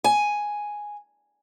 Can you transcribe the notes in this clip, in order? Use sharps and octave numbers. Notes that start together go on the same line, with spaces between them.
G#5